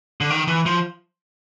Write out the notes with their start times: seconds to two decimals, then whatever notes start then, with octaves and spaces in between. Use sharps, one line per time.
0.21 D3
0.30 D#3
0.48 E3
0.66 F3